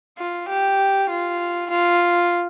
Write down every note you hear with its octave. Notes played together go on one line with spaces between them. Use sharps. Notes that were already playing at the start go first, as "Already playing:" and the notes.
F4
G4
F4
F4